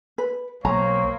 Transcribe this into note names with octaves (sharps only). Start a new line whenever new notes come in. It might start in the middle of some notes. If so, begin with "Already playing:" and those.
B4
B1 A#3 C4 C#5 A#5